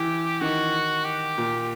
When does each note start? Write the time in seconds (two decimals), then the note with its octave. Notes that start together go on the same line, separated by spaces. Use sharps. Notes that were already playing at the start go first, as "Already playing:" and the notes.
Already playing: E3 G4
0.41 D#3 F#4
1.04 G4
1.38 A#2